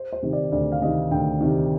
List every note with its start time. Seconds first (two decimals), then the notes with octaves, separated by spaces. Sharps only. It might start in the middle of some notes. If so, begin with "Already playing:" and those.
Already playing: C5
0.13 C5
0.22 C3 D#3
0.33 D5
0.52 D2 D5
0.72 F5
0.81 C3 D#3 D#5
1.11 D2 G5
1.41 C3 D#3